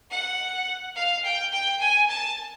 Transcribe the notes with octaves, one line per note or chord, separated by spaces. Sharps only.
F#5
F5
G5
G5
G#5
A5